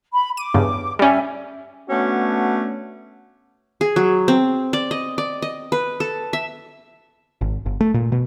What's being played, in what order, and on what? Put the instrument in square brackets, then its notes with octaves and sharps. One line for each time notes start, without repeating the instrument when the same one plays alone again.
[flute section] B5
[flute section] D6 [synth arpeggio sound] D#7
[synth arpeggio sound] E2 G2 C#3
[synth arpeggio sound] G3 C#4 [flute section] E5 G#5
[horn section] A3 B3 C#4 D4 F#4
[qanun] G#4
F#3
C4
D5
D#5
D5
D#5
B4
A4
E5
[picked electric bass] G#1
G1
A3
A#2
B2